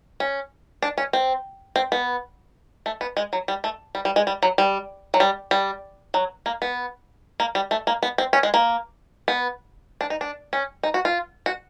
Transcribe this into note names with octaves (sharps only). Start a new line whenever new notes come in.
C#4
D4
C#4
C4
C4
B3
A3
B3
G#3
F#3
G3
A3
G3
G3
G#3
G3
F#3
G3
F#3
G3
G3
F#3
A#3
B3
A#3
G3
A3
A#3
B3
C4
C#4
G#3
A#3
B3
D4
D#4
D4
C#4
D#4
F#4
F4
F#4